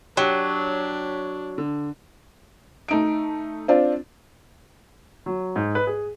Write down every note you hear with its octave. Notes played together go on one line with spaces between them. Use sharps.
F#3 D4 G4
D3
A3 D#4 D7
C4 D4 F4
F#3
G#2
B4
G#4